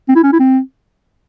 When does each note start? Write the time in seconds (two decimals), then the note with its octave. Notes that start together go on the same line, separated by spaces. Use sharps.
0.09 C4
0.16 E4
0.23 C#4
0.33 E4
0.40 C4